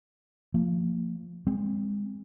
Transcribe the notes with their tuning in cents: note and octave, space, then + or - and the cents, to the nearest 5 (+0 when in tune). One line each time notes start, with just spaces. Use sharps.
F3 +0 A#3 -30
G#3 -30 C4 +0